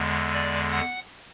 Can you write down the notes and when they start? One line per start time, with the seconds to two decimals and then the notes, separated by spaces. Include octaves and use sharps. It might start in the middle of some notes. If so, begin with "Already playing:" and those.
Already playing: E2 D3 G#3
0.33 D5
0.72 F#5